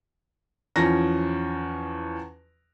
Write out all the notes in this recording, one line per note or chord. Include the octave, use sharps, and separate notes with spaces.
E2 F3 C#4 A#6